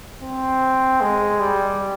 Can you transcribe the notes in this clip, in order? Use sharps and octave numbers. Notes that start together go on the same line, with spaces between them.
C4
G#3
G3